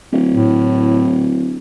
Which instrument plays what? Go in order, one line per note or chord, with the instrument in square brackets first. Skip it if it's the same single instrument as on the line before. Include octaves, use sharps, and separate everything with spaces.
[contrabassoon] D1
[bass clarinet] A2